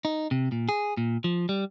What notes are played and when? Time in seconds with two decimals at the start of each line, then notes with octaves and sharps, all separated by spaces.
0.05 D#4
0.31 C3
0.52 A#2
0.69 G#4
0.97 A#2
1.24 F3
1.49 G3